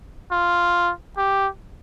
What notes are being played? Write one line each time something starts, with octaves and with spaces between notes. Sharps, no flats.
F4
G4